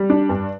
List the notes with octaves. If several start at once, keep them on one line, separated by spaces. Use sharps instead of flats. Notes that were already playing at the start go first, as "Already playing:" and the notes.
Already playing: G3
D4
G2